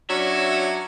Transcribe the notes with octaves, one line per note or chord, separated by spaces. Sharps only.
F#3 C#4 D4 E5